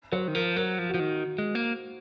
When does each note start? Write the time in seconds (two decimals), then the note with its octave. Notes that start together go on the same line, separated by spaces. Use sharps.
0.12 F#3 C5
0.28 D#3
0.35 F3 A#4
0.56 F#3 A#4
0.79 F3
0.89 F#4
0.94 F3
1.00 D#3
1.38 G#3
1.55 A#3